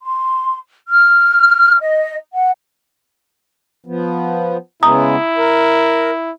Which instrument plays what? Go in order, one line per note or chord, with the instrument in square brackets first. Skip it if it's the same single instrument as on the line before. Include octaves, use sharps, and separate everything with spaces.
[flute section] C6
F6
D#5
F#5
[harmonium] F3 B3
[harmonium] C#3 G#3 B3 [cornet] E4 [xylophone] A#5 D#6
[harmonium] A#4